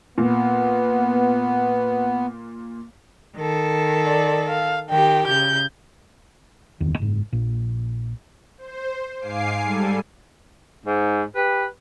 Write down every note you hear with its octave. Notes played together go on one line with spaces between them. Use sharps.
A#2 B3
D#3 A4
D5
F5
D#3 G4 G5
C#3 G6
D1 G1 E2 D#3
F#1 G#2
A#1 A#2
C5
G#2 F5 G#5 D6 C7
G3 A4 G#5
G#2
G4 B4